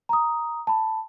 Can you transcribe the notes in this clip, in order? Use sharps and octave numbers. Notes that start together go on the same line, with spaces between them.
A#5 D#6
A5 B5